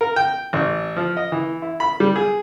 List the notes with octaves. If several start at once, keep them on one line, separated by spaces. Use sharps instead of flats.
A#4
G5
A1
F3
D#5
E3
E4
B5
G3
G#4